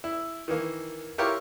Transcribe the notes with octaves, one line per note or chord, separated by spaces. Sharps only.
E4
D#3 E3 A#3
E4 F4 G4 A#4 C#5